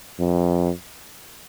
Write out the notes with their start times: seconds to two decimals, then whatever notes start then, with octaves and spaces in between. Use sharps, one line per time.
0.19 F2